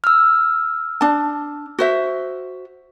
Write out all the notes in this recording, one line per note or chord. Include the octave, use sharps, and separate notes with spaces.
E6 F6
D4 A5
F#4 C5 E5